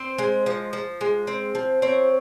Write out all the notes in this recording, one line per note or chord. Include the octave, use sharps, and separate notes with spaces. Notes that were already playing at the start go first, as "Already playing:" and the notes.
Already playing: C4 C5
G#3
F3
F3
G#3
C4
F3
C4 C#5